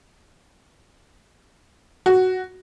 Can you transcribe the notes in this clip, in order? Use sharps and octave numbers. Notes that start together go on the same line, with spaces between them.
F#4